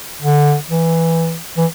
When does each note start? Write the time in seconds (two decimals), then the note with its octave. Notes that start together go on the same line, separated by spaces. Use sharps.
0.22 D3
0.70 E3
1.57 E3